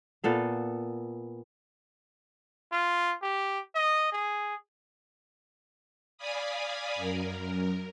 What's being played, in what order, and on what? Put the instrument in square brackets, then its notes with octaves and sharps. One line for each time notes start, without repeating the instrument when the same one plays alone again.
[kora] A#2 B3 A4 F5
[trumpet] F4
G4
D#5
G#4
[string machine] D5 F5 G#5 B5 D#6
F#2 A#4